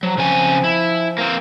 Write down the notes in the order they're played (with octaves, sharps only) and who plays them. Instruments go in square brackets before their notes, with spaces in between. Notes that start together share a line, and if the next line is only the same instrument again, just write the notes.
[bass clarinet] F3 [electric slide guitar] F#3
[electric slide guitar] C#3 C4 G#5
E4
A#3 C4